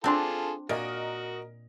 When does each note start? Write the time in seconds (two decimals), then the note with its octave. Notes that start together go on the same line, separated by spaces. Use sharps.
0.04 C4 D4 F4 G#4 A4 A5 C6
0.69 A#2 F#4 A#4 D#5